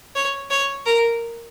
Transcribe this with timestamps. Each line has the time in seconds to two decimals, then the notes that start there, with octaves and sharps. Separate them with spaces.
0.16 C#5
0.50 C#5
0.86 A#4